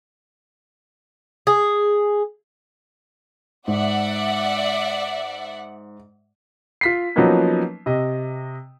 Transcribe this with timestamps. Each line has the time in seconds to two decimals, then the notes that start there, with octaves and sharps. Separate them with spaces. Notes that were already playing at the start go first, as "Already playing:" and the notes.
1.47 G#4
3.68 G#2 D5 E5 F#5
6.81 F4 B6 C7
7.16 F3 F#3 A#3 B3 C#4 D#4
7.86 C3 D#5